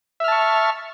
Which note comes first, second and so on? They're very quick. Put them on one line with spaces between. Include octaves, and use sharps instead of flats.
E5 F6 A5 C#6